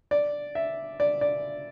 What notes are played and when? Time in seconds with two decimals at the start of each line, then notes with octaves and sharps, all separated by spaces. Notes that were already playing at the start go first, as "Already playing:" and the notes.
0.11 D5
0.55 E5
1.00 D5
1.21 D5